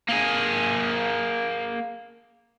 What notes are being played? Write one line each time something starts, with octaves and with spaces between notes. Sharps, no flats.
A#3 G#4